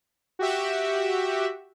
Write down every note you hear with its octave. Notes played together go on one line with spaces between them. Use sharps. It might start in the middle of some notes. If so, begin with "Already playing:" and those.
F#4 G4 E5